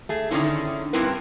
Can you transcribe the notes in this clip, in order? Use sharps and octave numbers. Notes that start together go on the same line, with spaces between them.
A3 G#4
D3 D#3 F3 A#3 C#4 E4
G2 C4 E4 A#4 B4